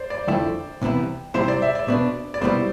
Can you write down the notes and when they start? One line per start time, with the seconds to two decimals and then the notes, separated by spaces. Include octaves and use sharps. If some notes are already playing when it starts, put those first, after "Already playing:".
Already playing: C5 D5
0.10 D5
0.28 F2 D3 F3 A3 E4 G5
0.82 C2 C3 E3 B3 E4
1.34 C3 G3 C4 E4 C5
1.48 D5
1.62 E5
1.75 D5
1.88 B2 B3 D4
2.34 D5
2.41 C2 B2 G3 B3 E4 C5